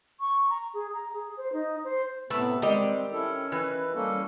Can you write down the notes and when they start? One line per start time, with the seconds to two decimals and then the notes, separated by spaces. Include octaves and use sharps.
0.20 C#6
0.50 A#5
0.74 G#4
0.94 A#5
1.13 G#4
1.37 C5
1.53 D#4
1.84 C5
2.30 A2 C3 A3 B3 B4
2.62 D#3 G3 G#3 C4 G4 D#5
3.13 C#4 E4 A4
3.52 E3 B4
3.95 G3 A#3 C#4 A4